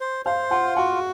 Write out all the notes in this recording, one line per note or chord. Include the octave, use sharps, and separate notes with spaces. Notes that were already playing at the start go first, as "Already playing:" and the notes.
C5
C5 F5
F4 F#5
F#4 F#5